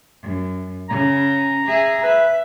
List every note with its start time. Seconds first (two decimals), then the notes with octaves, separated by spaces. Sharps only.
0.22 F#2
0.89 C#3 C#4 A#5
1.66 G#4 E5
2.03 B4 E5